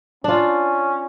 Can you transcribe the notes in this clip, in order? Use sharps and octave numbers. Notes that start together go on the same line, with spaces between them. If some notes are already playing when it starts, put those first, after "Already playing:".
C#4 D4 F4